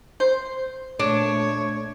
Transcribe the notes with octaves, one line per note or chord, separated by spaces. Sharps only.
C5
A#2 A3 D4 C#5